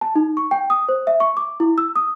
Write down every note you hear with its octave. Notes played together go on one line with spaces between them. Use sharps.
A5
D#4
C#6
G5
D#6
C5
E5
C#6
D6
E4
E6
D#6